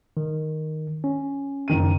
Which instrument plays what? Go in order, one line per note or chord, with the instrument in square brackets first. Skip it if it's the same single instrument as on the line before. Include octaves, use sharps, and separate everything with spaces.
[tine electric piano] D#3
C#4
[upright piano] F#1 D#3 D#7